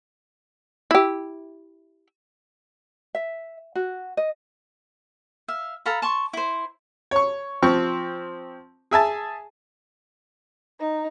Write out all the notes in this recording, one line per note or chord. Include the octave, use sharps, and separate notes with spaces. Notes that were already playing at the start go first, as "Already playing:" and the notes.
E4 G4
E5
F#4
D#5
E5 F5
A4 F5 A#5 B5
A5 C6 C#6
E4 C5
C#5 C#6
F3 C4 C#6
G#4 E5 G#5 A5
D#4